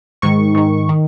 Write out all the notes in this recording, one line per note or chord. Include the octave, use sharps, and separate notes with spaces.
G#2 D#3 C#6
G#2 D#3
D#3